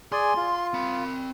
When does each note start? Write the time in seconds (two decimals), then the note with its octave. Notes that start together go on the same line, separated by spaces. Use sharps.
0.12 G#4 D5 G#5 C6
0.37 F4
0.74 C4 B5